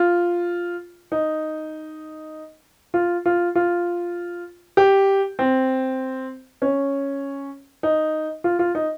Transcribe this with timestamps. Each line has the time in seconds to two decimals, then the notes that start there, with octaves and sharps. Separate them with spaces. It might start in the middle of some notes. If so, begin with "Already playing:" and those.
Already playing: F4
1.12 D#4
2.94 F4
3.26 F4
3.55 F4
4.77 G4
5.39 C4
6.62 C#4
7.83 D#4
8.44 F4
8.59 F4
8.75 D#4